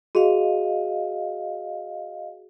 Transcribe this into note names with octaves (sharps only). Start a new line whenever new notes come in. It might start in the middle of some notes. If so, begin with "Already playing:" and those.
F#4 G#4 D#5 F5